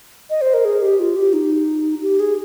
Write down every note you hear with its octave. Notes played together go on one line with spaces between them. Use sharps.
D#5
C5
A#4
G#4
G4
F4
G4
D#4
G4
G#4